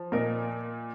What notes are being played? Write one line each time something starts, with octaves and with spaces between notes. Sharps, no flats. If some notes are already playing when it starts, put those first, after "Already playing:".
Already playing: F3
A#2 A#4 D#5